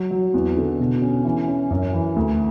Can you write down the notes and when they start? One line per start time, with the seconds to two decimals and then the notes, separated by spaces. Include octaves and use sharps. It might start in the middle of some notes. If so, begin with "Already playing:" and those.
Already playing: F#3
0.11 F#3
0.34 E2
0.56 D3
0.79 B2
1.02 C#4
1.25 E3
1.48 C#4
1.70 F#2
1.93 E3
2.16 D2